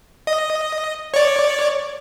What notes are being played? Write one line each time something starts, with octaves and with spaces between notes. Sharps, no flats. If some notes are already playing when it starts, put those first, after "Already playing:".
D#5
C#5 D5